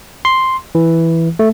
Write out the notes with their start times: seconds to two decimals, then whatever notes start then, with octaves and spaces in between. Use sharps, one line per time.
0.25 C6
0.75 E3
1.39 A3